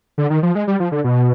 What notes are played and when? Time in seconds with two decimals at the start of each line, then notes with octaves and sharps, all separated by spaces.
0.18 D3
0.30 D#3
0.43 F3
0.55 G#3
0.67 G3
0.80 F3
0.92 D3
1.04 B2